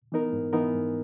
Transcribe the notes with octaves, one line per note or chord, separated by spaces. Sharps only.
E3 B3 D#4 A#4
G#2
E3 B3 D#4 A#4
G#2